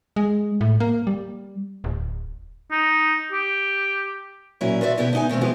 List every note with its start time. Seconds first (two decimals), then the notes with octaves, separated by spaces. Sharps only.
0.16 G#3
0.61 A2
0.80 A#3
1.07 G3
1.84 D1
2.71 D#4
3.32 G4
4.61 A#2 F#3 C#4 E4
4.81 F4 F#4 B4 D5 E5
4.98 B2 D3 B3 E4 G4
5.13 B3 D#4 G#5
5.29 B2 D#3 A3 C4
5.41 E3 F3 G#3 B3 G4